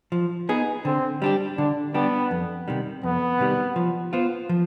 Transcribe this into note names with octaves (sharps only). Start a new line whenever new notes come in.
F3
B3 D#4 G#4
D3 C4
G3 D4 G4
D3 D4
G3 B3 D4 G4
F2
C3 D#3 G3
F2 B3
C3 D#3 G3
F3
B3 F4 C5
F3